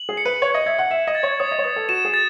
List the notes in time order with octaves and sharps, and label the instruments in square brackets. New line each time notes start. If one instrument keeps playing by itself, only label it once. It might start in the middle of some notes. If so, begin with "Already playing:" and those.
Already playing: [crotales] F#7
[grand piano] G#4
[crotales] C#7
[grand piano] B4
[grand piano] C#5 [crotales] G#6
[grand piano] D#5
[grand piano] E5 [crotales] G#6
[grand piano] F#5
[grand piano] E5 [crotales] E7
[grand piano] D#5
[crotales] A6
[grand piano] C#5
[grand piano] C#5 [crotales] D#6
[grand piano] D#5
C#5
[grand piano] B4 [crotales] D#6
[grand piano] A4
[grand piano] F#4 [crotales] E7
[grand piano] G#4
[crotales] A6